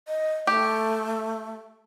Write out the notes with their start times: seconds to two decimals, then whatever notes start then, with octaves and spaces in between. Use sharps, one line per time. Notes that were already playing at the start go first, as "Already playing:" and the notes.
0.08 D#5
0.47 A3 G4